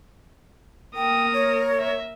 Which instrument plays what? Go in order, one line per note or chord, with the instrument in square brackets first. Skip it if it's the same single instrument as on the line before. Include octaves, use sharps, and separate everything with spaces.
[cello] A#3 A#4 [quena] G5 [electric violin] D#6
[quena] C#5
[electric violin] E5